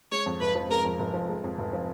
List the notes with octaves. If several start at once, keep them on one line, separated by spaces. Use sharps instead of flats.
G#3 C#5
F2
F1 B4
F3
G#3 A#4
F2
F1
F3
G#3
F2
F1
F3